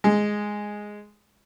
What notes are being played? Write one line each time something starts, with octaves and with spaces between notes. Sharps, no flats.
G#3